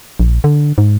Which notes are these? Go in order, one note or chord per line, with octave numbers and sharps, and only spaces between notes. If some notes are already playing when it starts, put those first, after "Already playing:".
A#1
D3
G#2